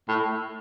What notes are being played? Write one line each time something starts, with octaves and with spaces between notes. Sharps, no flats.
A2